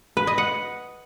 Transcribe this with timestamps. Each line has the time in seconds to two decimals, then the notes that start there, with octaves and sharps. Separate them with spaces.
0.17 B4
0.27 D#5
0.38 F#5